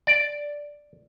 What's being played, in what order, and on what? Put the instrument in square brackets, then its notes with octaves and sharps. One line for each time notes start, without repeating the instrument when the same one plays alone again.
[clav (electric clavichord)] D5